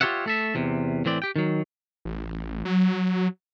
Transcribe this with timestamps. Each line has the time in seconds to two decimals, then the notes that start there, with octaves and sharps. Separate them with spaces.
0.01 F4 G4 A4 C#5 E5 F#5
0.26 A3 A4 E5
0.55 E2 C3
1.05 A2 E3 C4 D5
1.22 G4 G5
1.36 D#3 F#3
2.05 A1
2.65 F#3